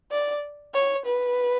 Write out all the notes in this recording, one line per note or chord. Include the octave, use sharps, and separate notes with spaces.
D5
C#5
B4